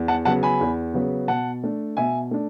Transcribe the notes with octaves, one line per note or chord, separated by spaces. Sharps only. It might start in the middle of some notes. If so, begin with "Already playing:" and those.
Already playing: E2
F#5 A5
C#3 F#3 B3 F#5 A5
G#5 B5
E2
C#3 F#3 B3
B2 F#5 A5
A3 D4
B2 E5 G#5
A3 D4